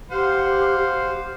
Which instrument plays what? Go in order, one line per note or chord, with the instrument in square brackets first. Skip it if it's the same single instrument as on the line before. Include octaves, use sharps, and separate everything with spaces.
[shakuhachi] G4 [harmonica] C5 F5 F#5